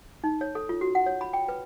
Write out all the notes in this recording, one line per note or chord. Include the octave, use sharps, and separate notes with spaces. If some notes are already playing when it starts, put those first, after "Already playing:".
D#4
C#5
A4
F4
F#4
F#5
C#5
B5
G5
B4